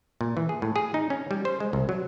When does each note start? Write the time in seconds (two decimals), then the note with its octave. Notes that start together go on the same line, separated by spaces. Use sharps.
0.21 A#2
0.37 E3
0.49 G#4
0.62 A2
0.76 G#4
0.94 D#4
1.10 C#4
1.31 G3
1.45 C5
1.60 G#3
1.73 C2
1.89 F#3